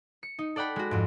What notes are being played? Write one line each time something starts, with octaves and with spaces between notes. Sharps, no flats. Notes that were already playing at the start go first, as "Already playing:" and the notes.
C#7
D#4
A4 D5 F#5 G5 B5
G#3 F#4
F2 G#2